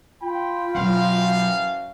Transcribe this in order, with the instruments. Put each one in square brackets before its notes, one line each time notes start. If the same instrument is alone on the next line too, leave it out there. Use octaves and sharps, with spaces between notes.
[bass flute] F4 [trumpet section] G5 B5
[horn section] F#2 E3 F5 [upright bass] B2 F#3